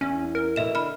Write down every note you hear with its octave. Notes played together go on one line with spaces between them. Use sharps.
E2 C#4
A#4
B2 E3 E4 A4 E5 E7
D3 B5 F6